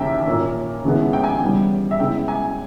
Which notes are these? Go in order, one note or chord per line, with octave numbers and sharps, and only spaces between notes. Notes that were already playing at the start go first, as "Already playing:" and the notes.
Already playing: D#2 C#3 E3 A#3 E5 G5
A#2 A#3 C#4
D#2 C#3 G#3 B3 E4
G5
G#5
G5
C#3 E3 G3 B3
E5
C#3 G#3 B3 E4 G5
G#5